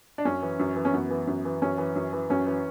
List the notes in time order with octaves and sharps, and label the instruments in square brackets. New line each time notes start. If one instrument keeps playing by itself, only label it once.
[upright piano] D4
F#2 C#4
E3
F#2
E3
C#4
F#2 B3
E3
F#2
E3
F#2 C#4
E3
F#2
E3
F#2 C#4
E3